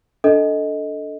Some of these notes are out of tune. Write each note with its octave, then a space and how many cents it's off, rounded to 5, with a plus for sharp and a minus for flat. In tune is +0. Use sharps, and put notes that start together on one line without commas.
D4 -10 A4 +0 D#5 +10